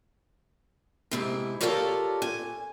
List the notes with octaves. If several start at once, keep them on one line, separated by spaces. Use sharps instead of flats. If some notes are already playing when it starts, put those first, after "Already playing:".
G#2 C3 E4
F4 G4 A4 A#4 C#5 D5
G#5